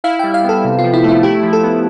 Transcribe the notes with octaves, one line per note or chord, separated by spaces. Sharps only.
E4 F5
G3 G5
F5
B3
A4
C3
F4
F3
E4
A3
E4
E4 G4
F3
A4
B3